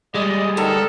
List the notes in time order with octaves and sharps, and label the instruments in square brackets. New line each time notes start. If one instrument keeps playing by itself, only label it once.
[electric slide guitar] G3 G#3 [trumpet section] D5 D#5
[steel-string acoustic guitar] D3 D#3 A#4 [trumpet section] B3 A4